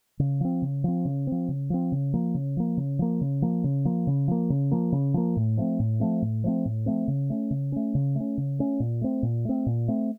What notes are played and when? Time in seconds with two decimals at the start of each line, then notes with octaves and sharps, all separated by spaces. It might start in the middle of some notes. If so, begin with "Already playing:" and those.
0.19 C#3
0.41 F3 C4
0.62 C#3
0.84 F3 C4
1.05 C#3
1.27 F3 C4
1.49 C#3
1.70 F3 C4
1.92 C#3
2.14 F3 A#3
2.35 C#3
2.57 F3 A#3
2.77 C#3
2.99 F3 A#3
3.21 C#3
3.42 F3 A#3
3.64 C#3
3.85 F3 A#3
4.07 C#3
4.28 F3 A#3
4.50 C#3
4.71 F3 A#3
4.92 C#3
5.14 F3 A#3
5.37 A2
5.57 F3 A3 C4
5.79 A2
6.00 F3 A3 C4
6.22 A2
6.44 F3 A3 C4
6.66 A2
6.86 F3 A3 C4
7.08 C#3
7.30 A3 C#4
7.51 C#3
7.72 A3 C#4
7.95 C#3
8.15 A3 C#4
8.38 C#3
8.59 A3 C#4
8.80 A#2
9.01 A3 C4
9.23 A#2
9.45 A3 C4
9.66 A#2
9.88 A3 C4